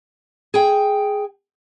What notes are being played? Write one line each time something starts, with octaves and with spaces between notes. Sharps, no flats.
G#4 G5